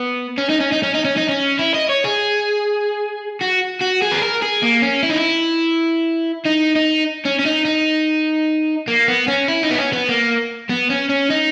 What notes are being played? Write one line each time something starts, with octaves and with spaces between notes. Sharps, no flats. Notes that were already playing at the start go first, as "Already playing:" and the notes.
Already playing: B3
C#4
D#4
C#4
D#4
C#4
D#4
C#4
D#4
C#4
E4
D#5
C#5
G#4
F#4
F#4
G#4
B4
A#4
G#4
A#3
C#4
E4
D#4
E4
D#4
D#4
C#4
C#4
D#4
D#4
A#3
B3
C#4
E4
D#4
B3
C#4
B3
A#3
B3
C#4
C#4
D#4